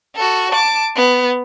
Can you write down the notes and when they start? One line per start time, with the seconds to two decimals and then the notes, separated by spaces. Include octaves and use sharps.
0.16 F#4 A4
0.52 A5 D6
0.96 B3